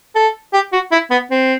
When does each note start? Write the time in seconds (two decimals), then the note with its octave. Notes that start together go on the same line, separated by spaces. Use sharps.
0.15 A4
0.53 G4
0.73 F#4
0.92 E4
1.11 B3
1.31 C4